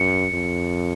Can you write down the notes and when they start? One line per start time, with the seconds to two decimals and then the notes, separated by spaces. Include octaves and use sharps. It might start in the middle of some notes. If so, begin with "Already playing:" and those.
Already playing: F#2 C#7
0.33 F2